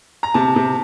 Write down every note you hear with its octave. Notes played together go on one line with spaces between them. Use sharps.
A#5
C3 A5
C3